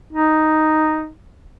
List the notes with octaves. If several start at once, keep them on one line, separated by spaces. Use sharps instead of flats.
D#4